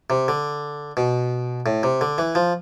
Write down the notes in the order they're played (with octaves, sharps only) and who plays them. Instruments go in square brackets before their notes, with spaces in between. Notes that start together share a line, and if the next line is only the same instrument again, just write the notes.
[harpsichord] C3
D3
B2
A2
C3
D3
E3
F3